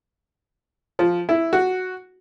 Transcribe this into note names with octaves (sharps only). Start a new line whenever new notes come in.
F3
E4
F#4